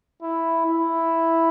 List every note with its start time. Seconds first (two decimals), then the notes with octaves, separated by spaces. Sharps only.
0.23 E4
0.66 E4